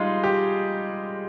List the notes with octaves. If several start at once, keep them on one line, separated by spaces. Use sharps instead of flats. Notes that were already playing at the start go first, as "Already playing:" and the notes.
Already playing: G3 G#3 D#4 F4
G4